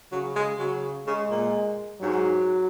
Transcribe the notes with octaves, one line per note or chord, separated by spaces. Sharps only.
C#3 F#3
G#3
C#3 F#3
C#3 G#3
A#2
G#2 F#3